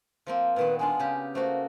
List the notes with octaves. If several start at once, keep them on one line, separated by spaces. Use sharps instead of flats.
F3 A#3 C4
A#2 D#3 B3 B4
G#3 D4 F4 G#5
C#3 G4
A3 A#3 F#4 C5